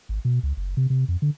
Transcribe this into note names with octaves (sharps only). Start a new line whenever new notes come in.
G#1
B2
C#2
F#1
C3
C3
F2
D3